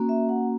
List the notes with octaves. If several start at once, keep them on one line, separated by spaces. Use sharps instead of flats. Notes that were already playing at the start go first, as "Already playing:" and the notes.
Already playing: A#3 C#4 F#4
E5
F#5